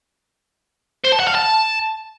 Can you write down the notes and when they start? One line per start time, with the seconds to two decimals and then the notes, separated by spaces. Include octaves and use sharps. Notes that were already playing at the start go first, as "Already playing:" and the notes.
1.04 C5
1.12 A5
1.20 F#5
1.27 F5
1.35 A5